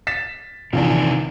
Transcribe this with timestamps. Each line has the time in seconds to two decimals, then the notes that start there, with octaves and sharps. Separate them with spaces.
0.07 A6 B6 E7
0.73 A#1 C3 D#3 E3 D4